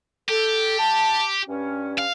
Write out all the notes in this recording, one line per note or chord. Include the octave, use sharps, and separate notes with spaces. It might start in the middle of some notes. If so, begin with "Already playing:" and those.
G4 A4
A5
G2 C#4
F5